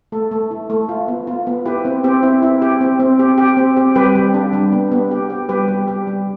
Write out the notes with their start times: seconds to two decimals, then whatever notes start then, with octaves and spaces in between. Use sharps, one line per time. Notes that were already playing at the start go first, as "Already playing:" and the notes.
0.12 A3 A4
0.31 A3
0.51 E4
0.70 A3
0.89 F4
1.08 B3
1.27 F4
1.47 B3
1.66 E4 G4 B4
1.85 C4
2.04 C4 G4
2.23 E4
2.42 E4
2.62 G4
2.81 C4
3.00 C4
3.19 G4
3.38 G4
3.57 C4
3.77 G4
3.95 G3 G4 B4
4.15 G3
4.34 D4
4.53 G3
4.72 B3
4.92 B3
5.11 G4
5.30 G4
5.49 G3 G4 B4
5.68 G3
5.88 G4
6.07 G3